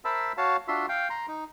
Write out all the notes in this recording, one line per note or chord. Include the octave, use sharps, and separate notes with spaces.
A#4 C5 E5 A5 B5 E6
F#4 C#5 F5 A5
D4 F4 F#4 E5 C6
F5 G5
A#5 C6
D#4